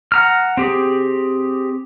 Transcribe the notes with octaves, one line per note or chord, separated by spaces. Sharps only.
F#5 A#5 F6
C4 G4 G#4